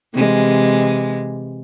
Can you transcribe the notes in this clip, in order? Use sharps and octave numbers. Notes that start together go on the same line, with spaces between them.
C3 E3 G#3